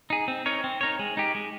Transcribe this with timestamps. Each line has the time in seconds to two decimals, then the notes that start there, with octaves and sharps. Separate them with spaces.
0.10 D#4 G#4
0.28 C4
0.46 D#4 A#4 C#5
0.64 C4
0.81 D#4 A#4 C#5
0.99 G#3
1.17 D#4 G4
1.35 G#3